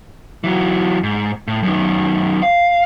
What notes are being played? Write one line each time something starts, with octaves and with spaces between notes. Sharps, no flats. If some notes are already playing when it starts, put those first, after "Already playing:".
E3 F#3
G#2
A2
F#2 D#3
F5